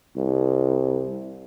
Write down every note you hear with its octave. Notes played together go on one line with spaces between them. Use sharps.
C2